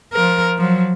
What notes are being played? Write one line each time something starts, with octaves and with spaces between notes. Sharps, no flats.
F3 A#4
F3 F#3